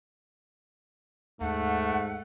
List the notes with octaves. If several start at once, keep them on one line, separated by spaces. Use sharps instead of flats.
D#2 G#2 A3 F#5